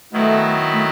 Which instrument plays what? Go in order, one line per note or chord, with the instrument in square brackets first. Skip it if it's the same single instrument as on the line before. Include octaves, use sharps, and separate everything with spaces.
[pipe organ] D#3 F#3 B3 E4 [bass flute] A3
[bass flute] A3